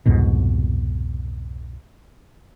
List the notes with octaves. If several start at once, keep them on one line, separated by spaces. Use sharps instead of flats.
C2 F2 G#2 B2